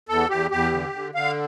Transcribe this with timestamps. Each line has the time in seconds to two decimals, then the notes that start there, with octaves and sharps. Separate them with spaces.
0.09 E2 A4
0.30 E2 G4
0.51 E2 G4
0.73 D3
0.93 D3
1.15 D3 F5